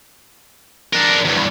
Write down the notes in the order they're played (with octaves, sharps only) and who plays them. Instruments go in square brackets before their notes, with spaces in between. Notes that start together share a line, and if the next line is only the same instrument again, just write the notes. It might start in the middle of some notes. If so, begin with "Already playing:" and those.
[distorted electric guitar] D4 A#4
E2 G2